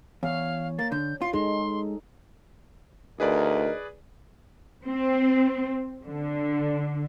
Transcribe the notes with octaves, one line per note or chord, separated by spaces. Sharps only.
E2 C#5 F5
A#3 A6
D3 G6
F4 C7
G#3 D#4 G#4 A4 C6
D2 D#4 G#4 A#4 B4 D5
C4
D3